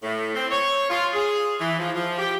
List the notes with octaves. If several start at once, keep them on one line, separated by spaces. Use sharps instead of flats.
A2
C4
C#5
F4
G#4
E3
F3
F3
G4